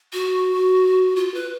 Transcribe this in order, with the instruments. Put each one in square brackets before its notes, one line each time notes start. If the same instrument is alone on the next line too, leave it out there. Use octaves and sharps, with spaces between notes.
[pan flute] F#4
F4
B4